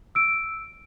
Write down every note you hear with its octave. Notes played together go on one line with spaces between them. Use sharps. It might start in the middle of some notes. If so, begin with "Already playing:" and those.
E6 D7